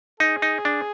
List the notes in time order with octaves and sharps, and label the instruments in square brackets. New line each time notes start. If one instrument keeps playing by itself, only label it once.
[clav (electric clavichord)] D#4 [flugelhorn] G#4
[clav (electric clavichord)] D#4
D4